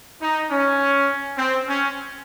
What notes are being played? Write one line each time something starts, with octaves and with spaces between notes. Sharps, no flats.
D#4
C#4
C4
C#4